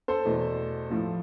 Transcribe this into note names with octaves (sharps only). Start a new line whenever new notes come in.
A4 C5
E2 B2 A3
A2 F3 A3